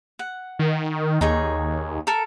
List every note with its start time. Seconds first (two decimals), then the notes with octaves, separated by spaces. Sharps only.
0.19 F#5
0.59 D#3
1.21 D#2 D#4 G#4 C#5
2.07 A4 A#4